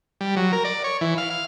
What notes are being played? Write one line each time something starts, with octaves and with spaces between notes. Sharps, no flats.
G3
F#3
A#4
D5
C#5
E3
F5
F5